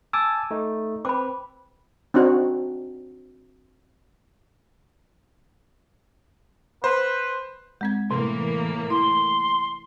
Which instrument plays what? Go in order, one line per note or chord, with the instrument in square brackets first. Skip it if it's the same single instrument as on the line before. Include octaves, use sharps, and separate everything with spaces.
[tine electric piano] G#5 A5 D6 [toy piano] E6
[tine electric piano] A3 D#4
[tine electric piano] C4 B4 [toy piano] B5 D6
[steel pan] C4 D4 D#4 F#4 C#5
[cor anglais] B4 [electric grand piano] C5
[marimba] G#3 C4 G#6
[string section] A2 E3 A#3 [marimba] C3
[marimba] E4 [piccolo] C6